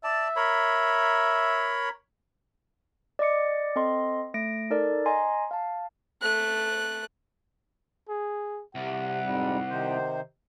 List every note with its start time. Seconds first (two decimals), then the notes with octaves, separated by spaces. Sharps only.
0.04 D5 E5 A5
0.36 A#4 C#5 B5
3.19 D5 D#5 D6 C#7
3.76 C4 A4 D#5 C6
4.34 A3 A#6 D7
4.70 D#4 A4 A#4 D5
5.06 D#5 G#5 A#5 C6
5.51 F5 A5
6.22 A3 F#6
8.09 G#4
8.75 C2 C3 F#5
9.22 F2 G#2 G3
9.69 C3 D#3 C5